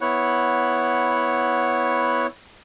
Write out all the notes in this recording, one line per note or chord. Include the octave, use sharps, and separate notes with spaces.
B3 E4 C#5 F#5